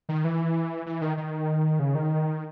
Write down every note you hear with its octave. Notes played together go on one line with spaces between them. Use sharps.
D#3
E3
E3
D#3
D#3
C#3
D#3